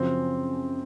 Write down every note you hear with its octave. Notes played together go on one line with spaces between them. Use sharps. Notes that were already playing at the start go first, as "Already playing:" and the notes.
Already playing: F#2 C#3 F3 C4